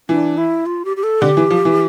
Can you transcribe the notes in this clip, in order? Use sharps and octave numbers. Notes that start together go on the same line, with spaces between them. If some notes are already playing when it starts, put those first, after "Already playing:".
E3 D4
E4
F4
G4
G4
A4
D3 G4
E3
F3
E3